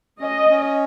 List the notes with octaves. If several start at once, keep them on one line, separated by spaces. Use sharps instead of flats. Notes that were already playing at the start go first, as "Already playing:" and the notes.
C#4 D#5
C#4